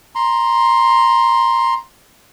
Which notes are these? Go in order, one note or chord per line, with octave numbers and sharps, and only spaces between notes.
A#5 C6